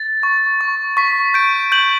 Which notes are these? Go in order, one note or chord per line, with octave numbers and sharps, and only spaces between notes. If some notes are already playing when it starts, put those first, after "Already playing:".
Already playing: A6
C#6
C#6
C#6 B6
G6 D7
G6 F#7